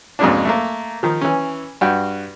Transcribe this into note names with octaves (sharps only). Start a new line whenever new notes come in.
F2 G#2 B2 A#3 C#4 D4
A3 A#3
D#3 F3
E3 C#4
G2 F#4 G5